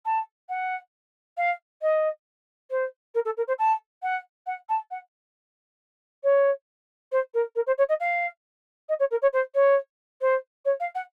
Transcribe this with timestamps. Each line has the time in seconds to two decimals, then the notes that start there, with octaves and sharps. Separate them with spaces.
0.05 A5
0.49 F#5
1.37 F5
1.82 D#5
2.70 C5
3.14 A#4
3.25 A4
3.37 A#4
3.47 C5
3.58 A5
4.03 F#5
4.46 F#5
4.69 A5
4.91 F#5
6.24 C#5
7.12 C5
7.34 A#4
7.55 A#4
7.67 C5
7.78 C#5
7.89 D#5
8.00 F5
8.89 D#5
8.99 C#5
9.11 A#4
9.22 C#5
9.33 C5
9.55 C#5
10.21 C5
10.65 C#5
10.80 F5
10.95 F#5